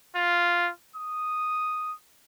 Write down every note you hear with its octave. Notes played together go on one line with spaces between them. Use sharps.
F4
D#6